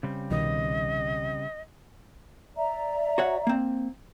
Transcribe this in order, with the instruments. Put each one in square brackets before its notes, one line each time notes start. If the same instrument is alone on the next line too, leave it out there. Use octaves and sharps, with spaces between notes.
[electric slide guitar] C#3 G3 C4
[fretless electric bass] C2 B2 D#3 [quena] D#5
[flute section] D5 E5 A#5
[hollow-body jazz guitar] F#4 C#5 F#5
A#3 C4